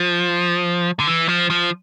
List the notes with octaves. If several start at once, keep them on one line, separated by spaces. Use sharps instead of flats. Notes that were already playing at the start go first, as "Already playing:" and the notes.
Already playing: F3
D3
E3
F3
F3